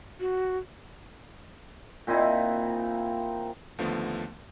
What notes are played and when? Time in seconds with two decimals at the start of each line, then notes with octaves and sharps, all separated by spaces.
0.20 F#4
2.07 A#2 C4 D#4 E4
3.78 D#2 D3 F3 A3 B3